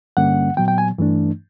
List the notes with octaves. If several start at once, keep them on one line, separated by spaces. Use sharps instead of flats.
G2 D3 G3 A#3 C#4 F#5
A#2 F#3 B3 G5
G5
G#5
G2 E3 A3 D4